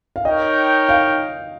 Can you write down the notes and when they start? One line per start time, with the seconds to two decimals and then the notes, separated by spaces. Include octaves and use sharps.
0.16 F5
0.25 D#4 A#4 C#5 D#5 G5
0.89 F5